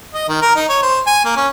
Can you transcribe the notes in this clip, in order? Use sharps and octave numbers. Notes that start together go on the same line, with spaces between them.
D#5
D#3
A#4
D#4
C#5
C5
G#5
A#3
C#4